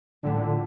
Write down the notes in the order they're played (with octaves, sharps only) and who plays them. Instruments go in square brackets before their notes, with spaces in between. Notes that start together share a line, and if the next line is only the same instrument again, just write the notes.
[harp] A#1 A2 A3 [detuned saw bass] D3